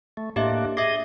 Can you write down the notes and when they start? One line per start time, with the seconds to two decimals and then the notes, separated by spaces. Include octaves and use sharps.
0.17 A3
0.36 A2 A#3 D4 G4 D#5 E5
0.77 G#4 D#5 E5 D6